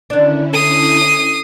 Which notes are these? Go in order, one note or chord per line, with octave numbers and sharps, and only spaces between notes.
D3 D#3 C#4 D4 E4
A4 D#6 C7